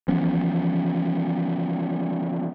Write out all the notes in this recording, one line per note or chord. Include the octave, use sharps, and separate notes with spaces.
E3 F3 B3 C#4